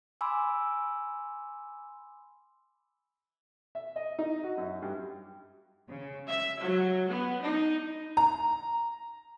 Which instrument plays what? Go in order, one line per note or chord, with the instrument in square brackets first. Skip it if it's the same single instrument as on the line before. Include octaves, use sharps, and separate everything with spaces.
[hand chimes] G#5 B5 C6 D6 E6
[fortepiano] E5
D#5
D#4
F#4
F#2
G2
[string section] C#3
E5
F#3
B3
D#4
[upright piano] A#5